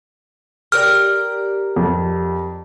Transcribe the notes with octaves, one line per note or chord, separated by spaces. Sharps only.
G4 A#4 D5 F6
F2